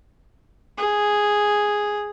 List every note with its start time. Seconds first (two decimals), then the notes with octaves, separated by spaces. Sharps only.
0.78 G#4